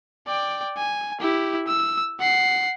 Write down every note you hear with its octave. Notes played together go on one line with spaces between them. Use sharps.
D5 G5
G#5
E4 G4
E6
F#5 C7